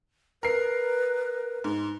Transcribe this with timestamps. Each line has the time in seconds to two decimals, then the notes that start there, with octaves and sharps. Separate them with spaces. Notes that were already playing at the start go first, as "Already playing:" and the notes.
0.43 A#4 B4 C7
1.64 G#2